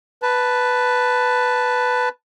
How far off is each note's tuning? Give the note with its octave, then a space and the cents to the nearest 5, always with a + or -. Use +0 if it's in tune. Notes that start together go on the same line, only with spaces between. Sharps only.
B4 +0 A5 +0